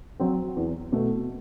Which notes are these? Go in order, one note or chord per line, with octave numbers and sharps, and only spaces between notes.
F#3 C4
E2
B2 A3